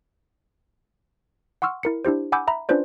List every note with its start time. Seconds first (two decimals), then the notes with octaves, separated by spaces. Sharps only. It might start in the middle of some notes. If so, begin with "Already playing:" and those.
1.62 F#5 C6 C#6 E6 F6
1.83 E4 A#4 C#7
2.05 D4 E4 G4 C5
2.32 F#5 G#5 B5 D6 E6 G6
2.47 E5 A#5 B5
2.69 C#4 D4 F4 B4 C5 D5